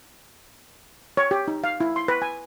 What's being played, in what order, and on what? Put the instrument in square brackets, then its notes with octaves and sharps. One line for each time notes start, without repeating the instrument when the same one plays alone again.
[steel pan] C#5
G4
D#4
F5
E4
C6
B4
G#5